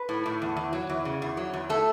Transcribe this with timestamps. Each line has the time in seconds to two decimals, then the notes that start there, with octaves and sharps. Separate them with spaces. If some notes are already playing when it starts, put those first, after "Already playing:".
Already playing: B4
0.09 A2
0.26 A2
0.42 E2
0.57 E2
0.73 F#3
0.89 E2
1.05 C#3
1.22 E2
1.37 F#3
1.53 E2
1.69 A3 A4